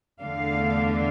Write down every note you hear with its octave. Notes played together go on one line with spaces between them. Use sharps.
E2 D3 A3 D4 F5